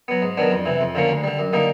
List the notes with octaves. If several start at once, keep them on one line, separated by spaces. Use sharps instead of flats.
F#3 B3
G#2
D#3 F#3 B3 D4
F2
C3 E3
F2
D3 F3 A#3 C#4
D2
D3 G3
F#2
D3 G3 A#3 D#4